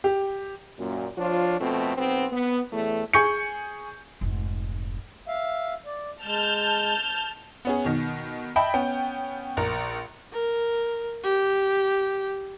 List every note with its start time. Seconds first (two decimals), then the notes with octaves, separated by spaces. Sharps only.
0.04 G4
0.79 F#2 A#2
1.18 F3 D4 F4 C#5
1.61 F2 B2 A3 C4
1.97 B1 B3 C4
2.32 B3
2.73 E2 A2 A3
3.14 G#4 C#6 G6 C#7
4.21 F1 G#2
5.28 E5 F5
5.86 D5
6.24 G#3 A5 F6 G6
7.65 B3 C#4 G#4
7.84 B2 D#3
8.56 D#5 E5 G5 A5 B5
8.74 B3 C#4 G5
9.57 A#1 A#4
10.32 A#4
11.23 G4